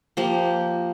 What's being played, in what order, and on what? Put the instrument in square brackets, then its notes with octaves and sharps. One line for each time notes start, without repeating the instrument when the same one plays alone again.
[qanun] F3 A#3 G4